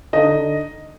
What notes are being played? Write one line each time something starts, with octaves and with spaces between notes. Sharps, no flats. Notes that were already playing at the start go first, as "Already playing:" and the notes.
D3 D#4 D#5
D3